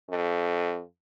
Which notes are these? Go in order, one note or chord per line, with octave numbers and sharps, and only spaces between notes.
F2